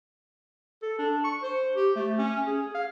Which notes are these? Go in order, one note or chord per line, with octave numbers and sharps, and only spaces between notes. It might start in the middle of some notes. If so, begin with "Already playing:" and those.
A4
D4
C#6
C5
G4
A3
C#4
G#4
F5